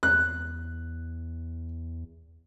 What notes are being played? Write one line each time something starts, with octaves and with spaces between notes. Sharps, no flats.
E2 F#6